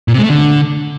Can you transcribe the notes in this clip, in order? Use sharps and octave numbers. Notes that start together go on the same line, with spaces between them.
A#2
C3
G#3
A3
D3